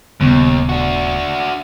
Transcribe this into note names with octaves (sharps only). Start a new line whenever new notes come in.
D#1 D#2 C#3 B3
D4 F#4